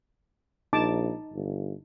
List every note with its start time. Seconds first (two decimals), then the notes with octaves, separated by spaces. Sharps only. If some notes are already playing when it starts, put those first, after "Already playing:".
0.73 A#1 D#4 A5 D6
1.33 G1